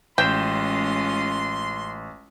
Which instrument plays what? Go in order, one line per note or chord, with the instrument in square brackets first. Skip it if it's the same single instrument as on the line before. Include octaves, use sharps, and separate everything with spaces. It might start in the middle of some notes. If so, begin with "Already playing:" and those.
[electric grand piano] A1 E7 [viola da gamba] G#3 C#4 F4 [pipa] G5 [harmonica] C6